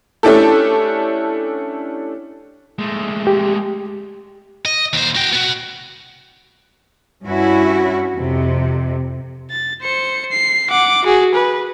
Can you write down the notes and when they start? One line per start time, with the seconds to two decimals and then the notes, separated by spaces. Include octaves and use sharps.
0.23 A3 C#4 D4 E4 G4 A4
2.79 G#3 A3
3.27 G4
4.66 D#5
4.93 D#2 C5
5.16 F#4 G5
5.33 B3 F#4
7.24 G2 C#4 E4 F#4
8.16 F2 C3
9.51 A6
9.82 C5 C#7
10.31 C7
10.69 F#5 D6
11.04 F#4 G#4
11.34 B4